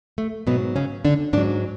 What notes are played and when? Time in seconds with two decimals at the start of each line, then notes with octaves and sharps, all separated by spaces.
0.18 A3
0.47 G#2 B2 F#3 B3
0.76 C#3 C#4
1.05 D3 D4
1.33 G#2 D3 D4
1.37 F#3